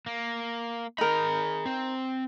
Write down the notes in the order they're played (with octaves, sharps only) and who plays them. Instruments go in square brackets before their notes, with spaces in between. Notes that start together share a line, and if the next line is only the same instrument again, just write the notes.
[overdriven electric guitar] A#3
[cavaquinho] D#4 A#4 [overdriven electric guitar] G#4 B5
[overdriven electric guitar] C4